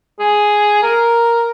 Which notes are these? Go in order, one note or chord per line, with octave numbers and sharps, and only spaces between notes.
G#4
A#4